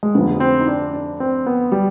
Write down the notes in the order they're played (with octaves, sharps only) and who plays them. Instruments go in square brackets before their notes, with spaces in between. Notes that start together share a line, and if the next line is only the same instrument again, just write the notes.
[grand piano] G#3
[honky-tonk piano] F1 F2 D3 [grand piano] B3
[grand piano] C4
D#4
D4
D4
C4
B3
G3